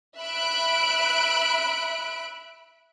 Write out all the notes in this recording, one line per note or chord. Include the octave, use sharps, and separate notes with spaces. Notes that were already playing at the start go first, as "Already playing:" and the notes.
E5 B5 F#6 D7